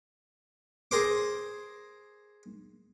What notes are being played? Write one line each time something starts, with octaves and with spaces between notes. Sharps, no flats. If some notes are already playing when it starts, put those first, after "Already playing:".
G#4 A#4 C5 D6